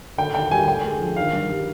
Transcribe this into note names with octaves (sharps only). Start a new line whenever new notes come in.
D3 G5
D#2 G5
G3 G#5
D3 G5
G#3
F3
D#3 F5
G2
G3